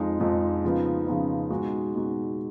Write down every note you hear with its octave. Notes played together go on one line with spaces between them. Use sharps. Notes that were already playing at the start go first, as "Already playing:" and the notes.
Already playing: F2 F3 G#3 D#4
F2 F3 G#3 D#4
C#3 F3 B3 D#4
C#3 F3 B3 D#4
B2 G#3 D#4 F#4
B2 G#3 D#4 F#4